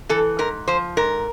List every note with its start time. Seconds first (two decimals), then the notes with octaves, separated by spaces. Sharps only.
0.09 E3 A4
0.39 G#2 A#4
0.68 F3 C5
0.97 G#2 A#4